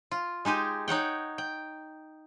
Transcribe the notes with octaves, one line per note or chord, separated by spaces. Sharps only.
F4
G#3 D#4 G4 G#5
D#4 C#5 F#5 G5
G5